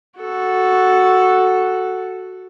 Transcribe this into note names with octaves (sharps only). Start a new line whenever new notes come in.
F#4 A4